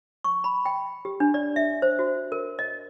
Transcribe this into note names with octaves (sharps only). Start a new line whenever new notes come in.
C#6
B5
G5
G4
D4
D5
E5
C5
F#4
A#4
D#5